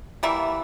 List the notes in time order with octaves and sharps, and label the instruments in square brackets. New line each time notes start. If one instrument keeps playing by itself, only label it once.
[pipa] E3 G3 A#3 E5